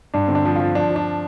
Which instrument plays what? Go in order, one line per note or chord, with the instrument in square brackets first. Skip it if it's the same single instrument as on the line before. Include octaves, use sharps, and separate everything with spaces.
[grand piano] G2 D4
D3 C4
D4
F3
F3 F4
F3 D4
F3
D4